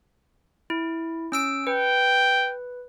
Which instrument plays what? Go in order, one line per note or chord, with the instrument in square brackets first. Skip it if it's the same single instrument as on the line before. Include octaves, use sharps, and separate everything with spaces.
[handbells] E4
C#4 E6 D7
[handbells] B4 [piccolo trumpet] G5